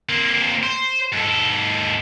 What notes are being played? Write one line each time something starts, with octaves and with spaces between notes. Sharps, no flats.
A#3 C4
C5
G#2 A4